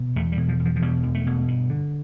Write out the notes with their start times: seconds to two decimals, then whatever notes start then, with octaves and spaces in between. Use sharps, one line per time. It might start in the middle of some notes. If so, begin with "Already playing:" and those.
Already playing: B2
0.16 E2 A3
0.32 G3
0.37 B2
0.49 F3
0.60 E2
0.65 F3
0.76 F3
0.82 B2 G3
1.03 E2
1.15 A3
1.26 B2
1.48 G2
1.70 D3